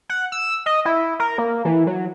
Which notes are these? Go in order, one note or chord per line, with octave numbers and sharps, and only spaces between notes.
F#5
E6
D#5
E4
A#4
A#3
E3
F#3